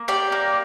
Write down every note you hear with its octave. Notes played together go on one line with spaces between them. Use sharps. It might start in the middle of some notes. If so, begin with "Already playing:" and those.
Already playing: A#3
G4 D5
A#3